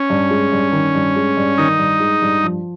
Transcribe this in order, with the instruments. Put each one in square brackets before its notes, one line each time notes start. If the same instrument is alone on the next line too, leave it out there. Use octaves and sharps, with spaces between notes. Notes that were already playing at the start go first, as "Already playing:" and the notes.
Already playing: [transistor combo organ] C#4
[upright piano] G2
G#3
G2
D#3
G2
G#3
G2
[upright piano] D#3 [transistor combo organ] D#4
[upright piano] G2
G#3
G2
F3